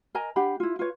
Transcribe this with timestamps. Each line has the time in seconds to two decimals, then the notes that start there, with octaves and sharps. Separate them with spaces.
0.15 A#4 D#5 G#5 A#5
0.36 D4 G4 F#5 B5
0.60 E4 F4
0.79 F4 B4 C#5